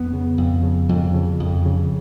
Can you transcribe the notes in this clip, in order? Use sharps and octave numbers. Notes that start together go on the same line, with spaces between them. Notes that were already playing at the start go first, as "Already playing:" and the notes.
Already playing: F2 B3
C#3
F2
C#3
F2
C#3
F2
C#3